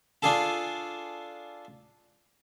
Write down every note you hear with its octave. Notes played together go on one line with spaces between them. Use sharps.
D4 F4 G#4 A4 A5